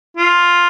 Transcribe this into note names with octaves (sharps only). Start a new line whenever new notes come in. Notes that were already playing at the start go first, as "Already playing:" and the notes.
F4